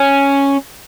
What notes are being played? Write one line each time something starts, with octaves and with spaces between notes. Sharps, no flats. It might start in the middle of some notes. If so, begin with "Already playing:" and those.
Already playing: C#4